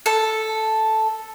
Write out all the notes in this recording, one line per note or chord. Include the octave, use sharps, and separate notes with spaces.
A4